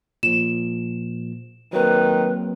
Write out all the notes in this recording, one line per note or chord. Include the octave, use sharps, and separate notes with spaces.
A#2 F3 E7
D#3 F#3 A#3 C4 B4